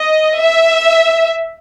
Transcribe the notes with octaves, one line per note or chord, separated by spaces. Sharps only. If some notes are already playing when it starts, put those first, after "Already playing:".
Already playing: D#5
E5